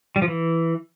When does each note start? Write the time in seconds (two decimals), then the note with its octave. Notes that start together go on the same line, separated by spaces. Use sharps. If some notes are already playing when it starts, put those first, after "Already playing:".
0.16 G3
0.22 F3
0.28 E3